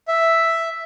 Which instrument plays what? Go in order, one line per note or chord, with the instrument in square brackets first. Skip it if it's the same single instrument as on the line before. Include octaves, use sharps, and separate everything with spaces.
[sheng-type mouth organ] E5